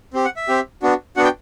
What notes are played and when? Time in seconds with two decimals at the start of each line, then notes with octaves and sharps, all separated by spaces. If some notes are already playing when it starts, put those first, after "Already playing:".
0.14 C4 G4
0.25 F#5
0.36 E5
0.48 C4 G4
0.82 B3 D4 F#4
1.16 B3 D4 F#4 F#5
1.24 G5